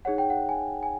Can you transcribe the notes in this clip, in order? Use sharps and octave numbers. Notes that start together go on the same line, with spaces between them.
D#4 G#4 C#5 F#5
G5
F#5
G#5
G#5